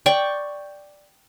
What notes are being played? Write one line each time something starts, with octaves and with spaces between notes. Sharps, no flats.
D5 G5 C#6